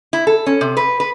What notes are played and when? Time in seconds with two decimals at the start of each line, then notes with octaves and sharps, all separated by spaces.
0.13 E4
0.27 A4
0.46 C#4
0.61 C3
0.77 B4
1.00 B4